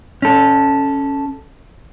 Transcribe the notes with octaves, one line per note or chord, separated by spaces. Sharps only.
C#4 A4